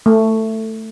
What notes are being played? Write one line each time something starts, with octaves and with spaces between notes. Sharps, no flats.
A3